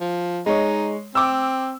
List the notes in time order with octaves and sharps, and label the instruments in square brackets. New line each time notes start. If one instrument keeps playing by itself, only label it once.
[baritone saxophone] F3
[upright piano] G#3 C#5 [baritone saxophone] D#4
[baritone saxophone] C4 [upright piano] D6 E6